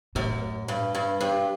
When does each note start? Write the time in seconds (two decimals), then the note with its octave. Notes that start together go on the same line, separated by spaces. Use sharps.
0.15 F#2 A2
0.68 G2
0.95 G2
1.21 G2